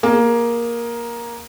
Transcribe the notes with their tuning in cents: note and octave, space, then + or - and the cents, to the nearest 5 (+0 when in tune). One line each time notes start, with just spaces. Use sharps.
A#3 +10 G#4 -5